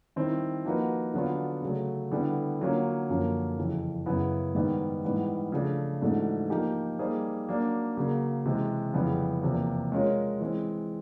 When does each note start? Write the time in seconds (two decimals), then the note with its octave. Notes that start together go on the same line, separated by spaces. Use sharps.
0.16 D#3 G3 C4 E4
0.65 F3 A#3 D#4 F#4 B4
1.14 D3 F#3 B3 D4 F4
1.62 C#3 F#3 A3
2.11 D3 G3 B3 E4 A4
2.61 D3 F#3 A#3 C#4 F4
3.09 F#2 D3 F3 A#3 C#4
3.57 F2 C#3 E3
4.06 F#2 C#3 F#3 B3 E4
4.55 G#2 D#3 G3 B3
5.05 G#2 E3 G3 B3
5.52 C#3 F3 A3 D4
6.01 G#2 E3 A3 D4 F#4
6.50 F3 A#3 D#4 G4
6.99 G3 A#3 D#4 G#4 C5
7.48 F#3 A#3 D4
7.97 C#3 F#3 A#3
8.45 C3 E3 G#3
8.94 F2 C#3 E3 G3 B3
9.43 E2 C3 F3 A#3
9.92 G#3 C#4 F4 A#4 C#5
10.40 E3 G#3 C4